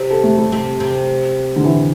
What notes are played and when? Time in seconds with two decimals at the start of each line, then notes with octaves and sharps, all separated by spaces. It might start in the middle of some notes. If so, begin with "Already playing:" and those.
Already playing: C3 C4
0.11 A4
0.23 A3
0.37 G3
0.51 C3 G3 C4
0.80 C3 C4
1.56 D3
1.64 E3